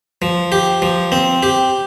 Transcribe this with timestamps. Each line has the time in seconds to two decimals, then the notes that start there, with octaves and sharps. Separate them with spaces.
0.22 F3
0.52 G4
0.82 F3
1.12 C4
1.43 G4